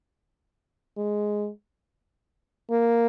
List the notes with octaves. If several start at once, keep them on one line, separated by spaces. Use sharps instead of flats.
G#3
A#3